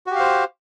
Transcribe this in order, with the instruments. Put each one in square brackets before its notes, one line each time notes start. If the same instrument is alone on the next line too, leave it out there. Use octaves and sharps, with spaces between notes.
[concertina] F#4
G4
F5
C5